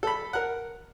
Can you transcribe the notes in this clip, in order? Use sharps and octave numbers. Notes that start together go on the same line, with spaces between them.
A4 B5
A#4 F#5